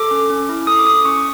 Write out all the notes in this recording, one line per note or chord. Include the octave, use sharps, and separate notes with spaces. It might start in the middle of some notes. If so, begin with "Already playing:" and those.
Already playing: A4 D6
C#4
C#4
E4
A4 D#6
D6
C#4 D#6
C#4 C#6